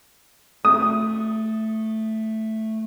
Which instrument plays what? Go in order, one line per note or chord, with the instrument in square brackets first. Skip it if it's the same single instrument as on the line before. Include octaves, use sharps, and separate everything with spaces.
[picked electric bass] A3 [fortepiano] D#6